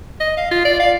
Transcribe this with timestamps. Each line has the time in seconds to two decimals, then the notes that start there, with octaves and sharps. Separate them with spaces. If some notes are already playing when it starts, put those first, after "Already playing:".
0.20 D#5
0.37 F5
0.51 F4
0.65 D5
0.80 F5